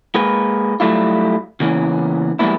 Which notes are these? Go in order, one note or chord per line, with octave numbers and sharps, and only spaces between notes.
G#3 A#3 B4
F#3 G3 A3 E4 F4
C#3 E3 A#3 B3 C#4
F3 G3 G#3 A#3 B3 E4